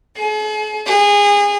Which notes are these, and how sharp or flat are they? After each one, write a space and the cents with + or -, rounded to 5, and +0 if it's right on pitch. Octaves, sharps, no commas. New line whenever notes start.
G#4 +45
G#4 -25